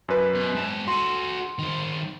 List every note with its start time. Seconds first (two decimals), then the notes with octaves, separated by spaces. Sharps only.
0.08 F#2 B4
0.35 B2
0.55 G#2 A5
0.88 F#4 A4 C6 D#7
1.59 D#3 C5